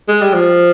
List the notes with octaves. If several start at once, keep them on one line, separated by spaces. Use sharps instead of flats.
G#3
G3
F3